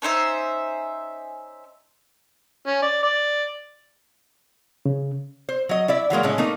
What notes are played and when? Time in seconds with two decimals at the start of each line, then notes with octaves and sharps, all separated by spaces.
0.02 C#4 D#4 C5 E5
2.67 C#4
2.82 D5
3.03 D5
4.86 C#3
5.49 C5
5.69 F#3 D#5
5.88 E4 D5 E5
6.10 E3 F#3 G#3 A#3
6.23 A2 C#3 G#3 C#4
6.38 A3 A#3 D#4